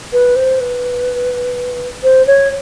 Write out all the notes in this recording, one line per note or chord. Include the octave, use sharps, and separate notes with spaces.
B4
C5
B4
C5
C#5